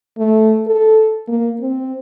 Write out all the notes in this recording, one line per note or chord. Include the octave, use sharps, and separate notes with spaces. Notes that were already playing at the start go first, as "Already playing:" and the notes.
A3
A4
A#3
C4